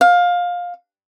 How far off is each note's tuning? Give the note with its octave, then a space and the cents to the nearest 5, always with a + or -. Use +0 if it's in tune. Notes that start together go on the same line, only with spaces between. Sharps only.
F5 +20